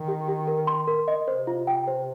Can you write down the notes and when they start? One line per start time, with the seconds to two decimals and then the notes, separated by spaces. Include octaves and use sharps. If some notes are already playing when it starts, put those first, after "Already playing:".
Already playing: D#3
0.08 G4
0.28 G4
0.47 A#4
0.67 C6
0.88 A#4
1.08 D#5
1.28 C3 C5
1.47 F4
1.67 G5
1.88 C5